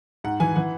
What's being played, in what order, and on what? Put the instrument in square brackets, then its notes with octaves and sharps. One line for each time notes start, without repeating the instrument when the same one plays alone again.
[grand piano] G#2 F#5
E3 G#5
E3 F#5